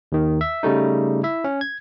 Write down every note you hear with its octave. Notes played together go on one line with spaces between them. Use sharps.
D#2 D#3
E5
C#3 G3 A3 D#4
E4 E5
C#4
G#6